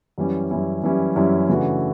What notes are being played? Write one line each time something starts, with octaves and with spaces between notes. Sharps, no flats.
F#2 E3 G3 C#4 E4
F#2 E3 G3 C#4 E4
F#2 E3 G3 C#4 E4
F#2 E3 G3 C#4 E4
C#3 E3 A3 D4 F#4